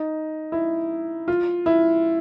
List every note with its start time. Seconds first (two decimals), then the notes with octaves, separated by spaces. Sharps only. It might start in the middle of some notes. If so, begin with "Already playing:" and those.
Already playing: D#4
0.52 E4
1.28 F4
1.66 E4